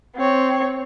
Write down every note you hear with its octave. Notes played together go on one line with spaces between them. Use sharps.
C4 C#5